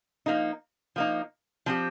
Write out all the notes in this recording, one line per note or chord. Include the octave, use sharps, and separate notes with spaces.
F3 A#3 D#4
F3 A#3 D#4
F3 C4 G4